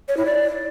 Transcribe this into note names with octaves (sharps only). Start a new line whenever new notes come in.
C#5
E4
D5